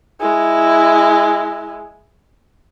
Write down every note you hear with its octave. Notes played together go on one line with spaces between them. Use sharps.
G#3 E4